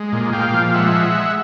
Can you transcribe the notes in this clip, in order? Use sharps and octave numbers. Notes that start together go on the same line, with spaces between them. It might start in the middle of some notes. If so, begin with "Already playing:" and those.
Already playing: G#3
A#2
A#2 F5 G5
F3
F5
G#3 E5 F#5